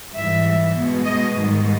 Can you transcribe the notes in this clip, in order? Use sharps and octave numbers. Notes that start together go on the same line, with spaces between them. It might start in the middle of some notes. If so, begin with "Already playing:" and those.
G#2 E3 G3 E5
B2 G#3 B3
D#5
G#2 D#3 G3